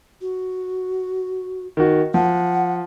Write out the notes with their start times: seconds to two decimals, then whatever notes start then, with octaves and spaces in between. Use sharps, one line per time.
0.21 F#4
1.77 D#3 F#4
2.14 F3 F#5